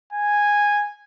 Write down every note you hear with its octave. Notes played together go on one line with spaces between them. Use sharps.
G#5